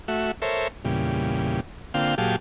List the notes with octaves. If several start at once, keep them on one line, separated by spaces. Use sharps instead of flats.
A3 F#4 E5
A4 A#4 C5 C#5 E5
E2 A#2 C#3 G3
D3 A#3 C4 F4 F5 G5
A#2 F#3 G4 G#4 F5 A5